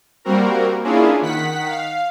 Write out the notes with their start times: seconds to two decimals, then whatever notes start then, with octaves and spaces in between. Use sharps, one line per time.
0.25 G3 A#3 C4 F#4 A#4
0.83 A#3 C#4 D4 E4 F4 G#4
1.22 D#3 F#5 B6
1.67 F5